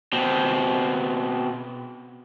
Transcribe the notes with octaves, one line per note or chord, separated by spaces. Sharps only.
B2 C4